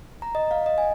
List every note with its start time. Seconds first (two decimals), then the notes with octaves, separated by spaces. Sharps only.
0.22 A#5
0.35 D#5
0.51 F5
0.66 D#5
0.78 G#5